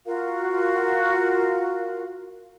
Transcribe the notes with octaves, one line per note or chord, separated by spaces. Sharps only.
F4 F#4 A#4 F5